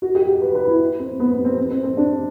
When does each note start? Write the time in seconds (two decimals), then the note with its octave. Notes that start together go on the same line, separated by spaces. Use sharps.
0.02 F#4
0.15 G4
0.28 G4
0.41 B4
0.55 B4
0.67 E4
1.00 C4
1.20 B3
1.31 B3
1.45 C4
1.58 C4
1.70 C4
1.83 C4
1.97 D4